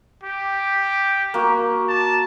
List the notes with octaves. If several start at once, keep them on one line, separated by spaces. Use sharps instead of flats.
G4
A#3 F#4
A5